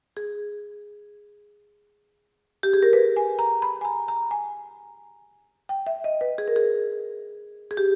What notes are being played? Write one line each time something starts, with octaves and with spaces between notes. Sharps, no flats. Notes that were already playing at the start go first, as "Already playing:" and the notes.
G#4
G4
G#4
A#4
B4
G#5
A#5
B5
G#5
A#5
A#5
G#5
G5
E5
D#5
B4
G#4
A#4
G#4
G#4
G4